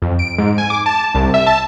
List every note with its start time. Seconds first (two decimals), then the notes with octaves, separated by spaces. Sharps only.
0.02 F2
0.19 D7
0.38 G#2
0.58 G#5
0.70 D6
0.86 A5
1.15 C2
1.34 E5
1.47 A5